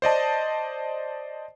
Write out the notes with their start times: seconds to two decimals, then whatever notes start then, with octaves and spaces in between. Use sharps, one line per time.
0.02 C5 D5 D#5 A5